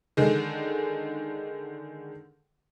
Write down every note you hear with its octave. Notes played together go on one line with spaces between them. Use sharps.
D3 D#3 G#3